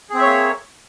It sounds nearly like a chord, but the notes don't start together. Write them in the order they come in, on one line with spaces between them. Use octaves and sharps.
G#4 C4 E5 C#5 A#3